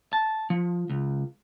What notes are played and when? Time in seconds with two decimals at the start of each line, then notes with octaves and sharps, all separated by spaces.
0.13 A5
0.50 F3
0.89 C#2